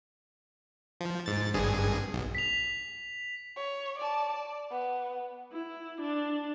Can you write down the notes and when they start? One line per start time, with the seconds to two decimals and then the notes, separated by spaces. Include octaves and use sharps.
1.01 F3
1.26 G#2 A6
1.54 G#1 G2 G#4
2.13 B1
2.35 B6 F7
3.57 C#5
3.99 D5 A5
4.34 D5
4.71 B3
5.53 E4
6.01 D4